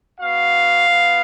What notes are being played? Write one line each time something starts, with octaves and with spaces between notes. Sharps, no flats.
B3 F#4 F5
B3 F4